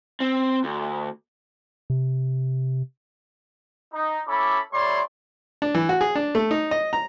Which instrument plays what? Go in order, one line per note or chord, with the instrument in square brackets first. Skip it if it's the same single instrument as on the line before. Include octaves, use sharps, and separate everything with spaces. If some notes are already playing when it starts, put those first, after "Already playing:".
[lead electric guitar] C4
D2
[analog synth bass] C3
[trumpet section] D#4
C#4 E4 A4 B5 D6
G3 A3 E4 C#5 D5 C6
[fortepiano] D4
E3
F#4
G#4
D4
A3
D#4
D#5
A#5